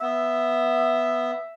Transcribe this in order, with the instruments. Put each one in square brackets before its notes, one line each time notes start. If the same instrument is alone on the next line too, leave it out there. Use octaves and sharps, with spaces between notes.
[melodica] B3 [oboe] E5